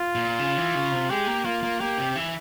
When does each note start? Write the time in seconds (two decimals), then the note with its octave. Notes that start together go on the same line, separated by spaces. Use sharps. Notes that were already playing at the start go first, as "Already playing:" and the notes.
Already playing: F4
0.15 A#2
0.39 C#3
0.57 E3
0.75 C#3
0.91 C3
1.10 G#3 G4
1.27 A#3
1.45 A#3 F4
1.63 A#3
1.80 A#3 G4
1.98 C3
2.16 E3